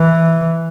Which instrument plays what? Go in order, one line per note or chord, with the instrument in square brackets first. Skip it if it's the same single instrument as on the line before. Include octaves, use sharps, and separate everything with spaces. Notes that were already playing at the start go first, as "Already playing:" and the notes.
Already playing: [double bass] E3